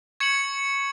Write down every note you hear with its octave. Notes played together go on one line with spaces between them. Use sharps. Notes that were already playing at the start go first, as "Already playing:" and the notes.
C#6 G#6 C#7 F#7